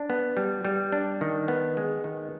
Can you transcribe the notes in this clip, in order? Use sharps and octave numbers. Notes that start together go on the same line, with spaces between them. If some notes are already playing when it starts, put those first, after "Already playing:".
Already playing: D4
B3
G3
G3
D4
D#3
B3
G#3
D#3